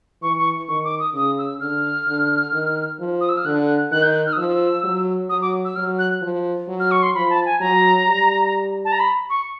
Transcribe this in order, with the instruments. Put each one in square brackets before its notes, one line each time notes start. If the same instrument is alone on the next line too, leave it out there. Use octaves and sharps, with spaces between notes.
[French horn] E3 [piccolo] C#6
[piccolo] C#6
[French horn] D#3 [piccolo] C#6
[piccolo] D6
D#6
[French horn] C#3 [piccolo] D#6
[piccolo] E6
[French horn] D3 [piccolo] F6
[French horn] D3
D#3
F3
[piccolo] D#6
E6
F6
[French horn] D3 [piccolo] F#6
[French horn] D#3 [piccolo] F#6
[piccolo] G6
F#6
F6
D#6
[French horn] F3 [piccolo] E6
[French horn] F#3
[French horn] F#3 [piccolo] D#6
[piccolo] D6
E6
[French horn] F#3 [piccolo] F6
[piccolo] F#6
[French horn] F3
F#3
[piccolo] F6
C#6
C6
[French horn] F3 [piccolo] B5
[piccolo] A5
G#5
[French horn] F#3 [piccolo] A#5
[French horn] G3
[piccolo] A5
A#5
B5
C#6